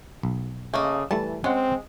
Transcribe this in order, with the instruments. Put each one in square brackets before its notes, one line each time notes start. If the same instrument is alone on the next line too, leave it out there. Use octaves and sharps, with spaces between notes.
[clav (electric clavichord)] B1
[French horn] C#3 [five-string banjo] A3 A#3 D#5
[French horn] E3 [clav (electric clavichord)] G3 A3 E4 [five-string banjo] A5
[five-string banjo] G#3 [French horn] C4 [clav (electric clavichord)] C#4 F#5